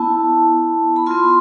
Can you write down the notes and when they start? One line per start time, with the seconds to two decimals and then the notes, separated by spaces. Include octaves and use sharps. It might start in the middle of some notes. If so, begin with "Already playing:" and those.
Already playing: B3 E4 A5
0.96 B5
1.06 B3 F4 C6